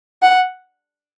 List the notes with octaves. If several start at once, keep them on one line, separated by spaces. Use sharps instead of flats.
F#5